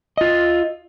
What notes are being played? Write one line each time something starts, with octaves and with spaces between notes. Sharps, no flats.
F4 D#5